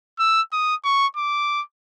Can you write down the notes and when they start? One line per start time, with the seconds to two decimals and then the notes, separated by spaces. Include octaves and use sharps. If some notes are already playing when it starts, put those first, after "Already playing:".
0.19 E6
0.52 D#6
0.84 C#6
1.17 D6